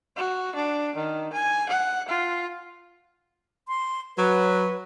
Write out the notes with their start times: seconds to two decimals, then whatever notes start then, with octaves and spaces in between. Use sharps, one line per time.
0.17 F#4
0.55 D4
0.96 D#3
1.33 G#5
1.69 F#5
2.08 F4
3.68 C6
4.17 F#3 B4